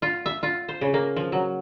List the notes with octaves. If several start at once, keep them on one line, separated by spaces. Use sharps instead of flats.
F4
E5
F4
C5
C#3
A#3
F3
F#3